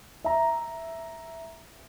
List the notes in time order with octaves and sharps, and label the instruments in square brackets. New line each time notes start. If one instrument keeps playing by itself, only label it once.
[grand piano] E5 A#5